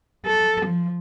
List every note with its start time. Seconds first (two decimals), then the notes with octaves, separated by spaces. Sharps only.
0.26 A4
0.66 F3